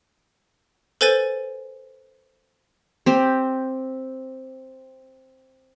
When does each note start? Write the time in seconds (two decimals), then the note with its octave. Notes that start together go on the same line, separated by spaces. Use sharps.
1.01 A4 B4 C5 G#5 A6 D#7
3.06 C4 G4